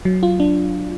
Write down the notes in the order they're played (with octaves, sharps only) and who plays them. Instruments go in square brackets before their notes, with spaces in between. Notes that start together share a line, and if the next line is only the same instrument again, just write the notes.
[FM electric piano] F#3
F4
D4